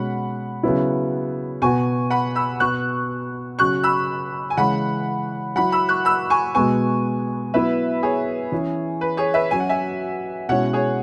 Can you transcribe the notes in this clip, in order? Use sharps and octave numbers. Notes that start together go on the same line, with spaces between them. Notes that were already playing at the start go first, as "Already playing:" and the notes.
Already playing: B2 G#3 C#4 F#5 B5
C#3 F#3 B3 E4
B2 B3 F#4 G#5 C#6
F#5 B5
B5 E6
B2 B3 F#4 C#6 F#6
C#3 F#3 C#4 F#4 C#6 F#6
B5 E6
G#5
C#3 E3 G#3 C#4 F#5 B5
F#3 E4 F#5 B5
B5 E6
C#6 F#6
B5 E6
G#5 C#6
B2 G#3 B3 G#5 C#6
F#3 B3 E4 B4 E5
G#4 C#5
E3 C#4 E4
B4
G#4 C#5
B4 E5
F#3 C#4 F#4 G#5
F#5
E5 G#5
B2 G#3 C#4 E4 C#5 F#5
G#4 C#5